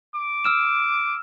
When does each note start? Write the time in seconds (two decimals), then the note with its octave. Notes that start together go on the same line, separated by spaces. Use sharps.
0.15 D6
0.44 E6 F6 E7